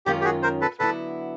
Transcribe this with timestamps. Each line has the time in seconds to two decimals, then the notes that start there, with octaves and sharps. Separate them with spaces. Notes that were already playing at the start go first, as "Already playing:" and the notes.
0.06 F#2 D#3 G#3 C#4 F4 G4
0.21 G4
0.25 F#4 G#4
0.43 A#4 C5
0.61 A4 B4
0.79 D3 F#3 B3 E4 A4 B4